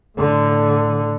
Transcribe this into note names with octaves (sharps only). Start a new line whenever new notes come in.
A2 D3